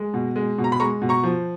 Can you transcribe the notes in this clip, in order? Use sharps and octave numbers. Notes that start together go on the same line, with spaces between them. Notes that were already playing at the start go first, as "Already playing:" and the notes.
Already playing: G#3
B2
G#3
B2
A#5
B5
G#3 A#5 C#6
B2
A#5 C#6
F3